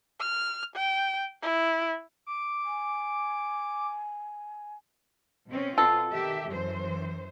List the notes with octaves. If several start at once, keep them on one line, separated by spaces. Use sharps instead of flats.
F6
G5
E4
D6
G#5
B2 C4 C#4
B2 F4 A4
D#3 G4 E5
F#2 E3 C5